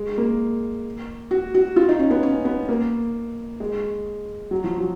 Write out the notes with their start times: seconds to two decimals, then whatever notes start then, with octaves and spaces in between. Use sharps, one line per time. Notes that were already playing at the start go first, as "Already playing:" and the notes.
Already playing: G#3
0.18 A#3
1.31 F#4
1.54 F#4
1.76 F4
1.89 D#4
1.99 C#4
2.11 B3
2.23 C#4
2.45 B3
2.69 A#3
3.60 G#3
4.51 F#3
4.64 F3
4.78 F#3